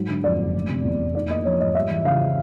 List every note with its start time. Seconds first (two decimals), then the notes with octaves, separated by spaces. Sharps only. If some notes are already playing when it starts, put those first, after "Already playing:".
Already playing: G#2 F#3
0.09 D3
0.24 F2 D5
0.40 F#1
0.54 F1
0.69 C3
0.84 E2
1.00 F1
1.15 D#4 D5
1.29 A#3 D#5
1.45 F3 C#5
1.60 G#2 D#5
1.75 G3 E5
1.90 E3
2.05 C#3 F5